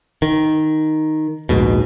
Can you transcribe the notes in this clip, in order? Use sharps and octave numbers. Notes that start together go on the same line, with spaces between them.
D#3
A#1 D#2 G#2 B2